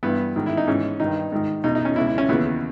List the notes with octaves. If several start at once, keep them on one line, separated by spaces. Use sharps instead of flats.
G2 E3 B3
G#2 D#3
E4
D#4
G#2 E3 C#4
G2 D#3 D#4
G#2 D#3
E2 B2 D#4
D#4
C#4
C#2 B2 E4
E4
C#4
D#2 C#3 E3 B3